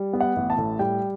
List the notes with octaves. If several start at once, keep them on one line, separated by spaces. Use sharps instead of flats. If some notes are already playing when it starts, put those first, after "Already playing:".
Already playing: G3
B3
F#5
A1
A5
A2
G3 G5